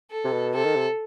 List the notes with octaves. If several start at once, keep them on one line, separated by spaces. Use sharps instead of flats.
A4
C3
B2
C3 A4
D#3
C3